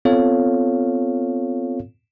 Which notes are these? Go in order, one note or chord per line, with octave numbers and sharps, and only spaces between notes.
B3 C4 F4 A4 C#5 F5